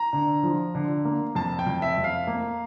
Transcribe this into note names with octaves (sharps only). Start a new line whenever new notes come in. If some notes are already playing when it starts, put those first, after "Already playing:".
Already playing: A#5
D3
F3
D3
A#3
F2 A5
G5
F2
E5
F2
F5
A#3